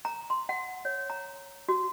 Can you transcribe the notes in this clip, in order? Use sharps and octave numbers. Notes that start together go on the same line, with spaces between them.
A#5
C6
F#5
C#5
A#5
F#4